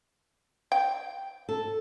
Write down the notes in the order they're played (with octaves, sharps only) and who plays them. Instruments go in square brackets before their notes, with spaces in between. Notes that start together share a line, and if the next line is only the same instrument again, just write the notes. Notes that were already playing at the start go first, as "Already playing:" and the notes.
[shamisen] G5
[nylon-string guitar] A4